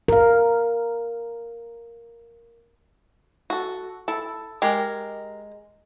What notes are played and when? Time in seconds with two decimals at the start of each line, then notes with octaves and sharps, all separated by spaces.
0.08 A#4 F5
3.50 F#4 A4
4.08 E4 A4
4.62 G#3 G4 A#4